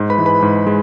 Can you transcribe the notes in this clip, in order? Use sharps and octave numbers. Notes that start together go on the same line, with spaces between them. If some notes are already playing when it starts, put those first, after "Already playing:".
Already playing: G#2
B4 B5
E3 G#3
B4 B5
G#2
G#3